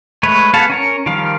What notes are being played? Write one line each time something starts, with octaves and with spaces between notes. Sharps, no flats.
G#3 A3 B4 C#5
B3 F#4 G#4 F5 A5
C#4 A#4 C#5
D#3 F3 G3 F5